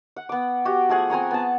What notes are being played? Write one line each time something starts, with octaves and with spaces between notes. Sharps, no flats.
F#5
B3 D6
F#4 G4
F3 A3 G#4 F#5
C4 G#5 A#5 C#6
B3 A5